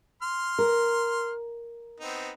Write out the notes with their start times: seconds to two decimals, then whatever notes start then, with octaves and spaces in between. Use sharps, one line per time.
0.22 C6 F6
0.59 A#4
2.00 B3 C4 D#4